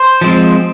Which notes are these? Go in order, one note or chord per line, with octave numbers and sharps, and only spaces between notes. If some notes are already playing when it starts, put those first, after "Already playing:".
Already playing: C5
F3 G#3 C4